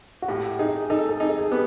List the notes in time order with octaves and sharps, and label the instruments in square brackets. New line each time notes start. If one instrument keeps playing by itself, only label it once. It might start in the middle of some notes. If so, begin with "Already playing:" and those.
[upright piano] F#4
[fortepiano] A2 [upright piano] G4
[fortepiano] D#4 [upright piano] G#4
[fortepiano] D#4 [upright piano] A4
[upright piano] A4
[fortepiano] D#4 [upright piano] G#4
[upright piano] A4
G#4
[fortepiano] B3 [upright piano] G4